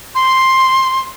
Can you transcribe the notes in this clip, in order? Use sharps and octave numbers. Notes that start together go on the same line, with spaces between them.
C6